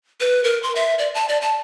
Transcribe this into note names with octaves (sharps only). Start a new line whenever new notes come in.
B4
A#4
C6
E5
D5
A5
D5
A5